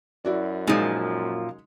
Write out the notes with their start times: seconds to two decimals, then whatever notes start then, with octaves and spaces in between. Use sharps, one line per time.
0.25 F#2 E4 F#4 D5
0.68 A#2 F3 G#3 D#4